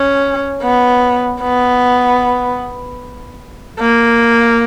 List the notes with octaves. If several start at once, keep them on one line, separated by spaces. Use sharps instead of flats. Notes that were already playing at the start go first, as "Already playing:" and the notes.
Already playing: C#4
B3
B3
A#3